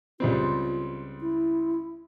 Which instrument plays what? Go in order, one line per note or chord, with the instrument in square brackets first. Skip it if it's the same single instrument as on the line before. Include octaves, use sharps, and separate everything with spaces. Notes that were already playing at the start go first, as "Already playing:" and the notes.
[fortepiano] C#2 G3 C4 [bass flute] F4
[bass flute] E4